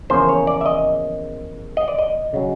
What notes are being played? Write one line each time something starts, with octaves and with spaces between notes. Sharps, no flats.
E2 C#3 F3 A#3 C#4 C5
C#5
D5
E5
D#5
D#5
D5
D#5
C#3 F#3